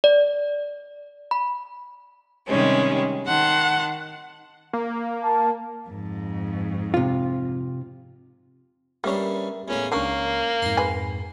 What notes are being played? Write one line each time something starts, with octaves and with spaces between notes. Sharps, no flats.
D5
B5
C3 D#3 G3 G#3 C#4
D#3 F#5 A5 C6
A#3
A5
F2 G#2
C3 F4
G2 C#3 G3 A#3 G4 A#4 C#5 E5
E2 A2 A#3 C#4
C#2 D#3 A#3 C#4 D4 A#4 C#6 C7
F2 G#2 A#5 C6
G#3 B4 G#5